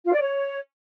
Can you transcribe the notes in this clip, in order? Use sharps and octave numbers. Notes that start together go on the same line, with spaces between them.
F4
D5
C#5